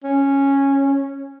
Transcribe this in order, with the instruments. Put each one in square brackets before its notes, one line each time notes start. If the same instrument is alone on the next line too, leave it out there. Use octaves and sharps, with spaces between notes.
[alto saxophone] C#4